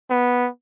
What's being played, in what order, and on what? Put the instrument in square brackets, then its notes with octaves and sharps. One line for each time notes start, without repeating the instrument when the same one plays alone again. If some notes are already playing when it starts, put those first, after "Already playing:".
[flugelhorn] B3